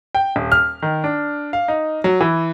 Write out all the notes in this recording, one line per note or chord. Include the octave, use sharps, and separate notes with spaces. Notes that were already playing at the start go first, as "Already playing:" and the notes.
G5
D#1
F6
D#3
D4
F5
D#4
F#3
E3